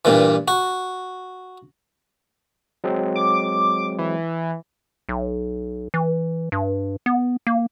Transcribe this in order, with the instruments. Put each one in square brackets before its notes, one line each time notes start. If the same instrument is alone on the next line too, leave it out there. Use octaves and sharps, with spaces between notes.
[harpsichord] G2 A#2 E3
F#4
[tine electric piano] F#3 G#3 C4
[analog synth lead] D6
E3
[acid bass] B1
E3
G2
B3
A#3